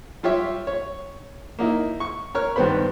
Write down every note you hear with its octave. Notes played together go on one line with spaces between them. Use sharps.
G3 F4 G4 C#5 E5
C#5
A#3 D#4 E4
C#6
A#4 C#5 F6
G2 D#3 B3 C5 B5